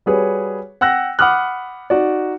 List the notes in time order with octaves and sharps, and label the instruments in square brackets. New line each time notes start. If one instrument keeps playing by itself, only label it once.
[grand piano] G3 F#4 G#4 B4 C#5
F#5 G5 E6 F#6 A#6
F#5 B5 D6 D#6 F6 F#6
D#4 F#4 D5